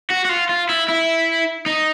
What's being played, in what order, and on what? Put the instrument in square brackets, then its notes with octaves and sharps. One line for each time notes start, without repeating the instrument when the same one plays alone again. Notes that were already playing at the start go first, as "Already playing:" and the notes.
[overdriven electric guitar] F#4
F#4
F4
F4
E4
E4
D#4